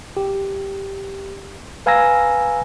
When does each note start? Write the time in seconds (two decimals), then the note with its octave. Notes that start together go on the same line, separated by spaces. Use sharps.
0.17 G4
1.86 B4 F5 G#5 A#5 E6 A#6